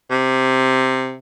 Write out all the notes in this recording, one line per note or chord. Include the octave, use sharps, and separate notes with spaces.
C3